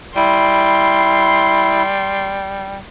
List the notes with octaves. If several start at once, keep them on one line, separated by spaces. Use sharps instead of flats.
G3 E4 C6